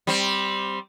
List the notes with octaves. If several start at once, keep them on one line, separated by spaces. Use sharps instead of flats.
G3 C4